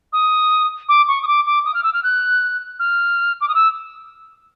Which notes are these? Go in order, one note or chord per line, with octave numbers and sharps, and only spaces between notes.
D#6
D6
C#6
D#6
D6
D6
D#6
F6
E6
F6
F#6
F6
D6
D#6
E6